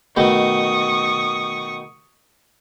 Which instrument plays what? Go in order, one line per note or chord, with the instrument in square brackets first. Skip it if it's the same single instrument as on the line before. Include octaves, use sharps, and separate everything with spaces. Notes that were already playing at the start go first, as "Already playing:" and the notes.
[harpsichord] B2 D#3 A3 [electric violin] C#6 D#6